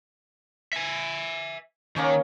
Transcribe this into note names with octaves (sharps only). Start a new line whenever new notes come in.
E5 G#5
D#3 A#3 C#4 C#5